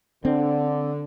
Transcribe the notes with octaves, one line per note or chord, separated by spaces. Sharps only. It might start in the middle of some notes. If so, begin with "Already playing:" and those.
D3 C4